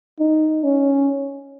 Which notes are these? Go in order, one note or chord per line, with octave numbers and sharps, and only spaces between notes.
D#4
C#4